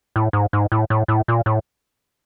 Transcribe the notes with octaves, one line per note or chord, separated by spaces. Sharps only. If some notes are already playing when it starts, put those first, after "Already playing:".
A2
G#2
G#2
A2
A2
A2
A#2
A2